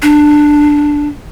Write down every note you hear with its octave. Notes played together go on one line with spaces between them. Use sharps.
D4